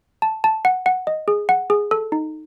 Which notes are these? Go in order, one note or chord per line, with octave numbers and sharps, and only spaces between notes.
A5
A5
F#5
F#5
D#5
G#4
F#5
G#4
A4
D#4